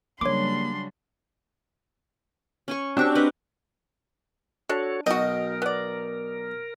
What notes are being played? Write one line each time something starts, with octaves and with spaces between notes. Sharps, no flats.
C#3 F#3 G3 A#3 D4 C#5 C6 D6
C#4 G#5 C#6
C4 D4 F#4 G4 C#6
A#4 B4 D#5
D4 F#4 A4 C#5
B1 D#4 F#4 A#4 D#5
B3 D5